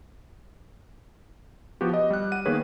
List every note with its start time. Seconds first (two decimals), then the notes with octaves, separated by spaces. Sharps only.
1.81 F3 B3 F#4 G4
1.94 D#5
2.10 G3 F#6
2.32 F#5 D#7
2.45 D#3 A#3 B3 G#4 B4 C#5